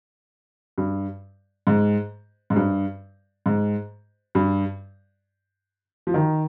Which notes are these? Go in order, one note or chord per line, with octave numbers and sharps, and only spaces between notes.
G2
G#2
G#2
G2
G#2
G2
F3
D#3